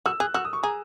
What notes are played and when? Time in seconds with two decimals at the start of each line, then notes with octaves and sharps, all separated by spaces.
0.06 F#4 E6
0.20 G#4 F#6
0.34 F#4 E6
0.45 D#6
0.53 C#6
0.63 G#4 A#5